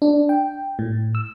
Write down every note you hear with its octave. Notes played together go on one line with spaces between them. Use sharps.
D4
G5
A2
E6